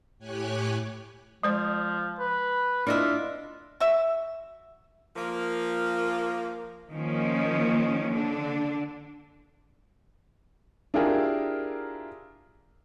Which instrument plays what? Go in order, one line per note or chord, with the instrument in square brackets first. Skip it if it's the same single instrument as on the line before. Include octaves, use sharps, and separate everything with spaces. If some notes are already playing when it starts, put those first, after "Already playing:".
[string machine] A2 G4 C#5 G#5 F#6
[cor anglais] F3 [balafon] G#3 C5 D5
[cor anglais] B4
[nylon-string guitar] D4 D#5 E5 [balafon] E4 [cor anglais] F4
[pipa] F#4 E5
[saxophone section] F3 A#3
[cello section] D#3 F3 A#3 C#4
D3 D4
[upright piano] D4 E4 F4 G4 G#4 A#4